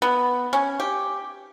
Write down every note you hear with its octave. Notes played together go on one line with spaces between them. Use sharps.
B3
C#4
G4